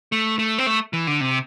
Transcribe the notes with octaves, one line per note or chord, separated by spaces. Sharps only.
A3
A3
C4
A3
E3
D3
C3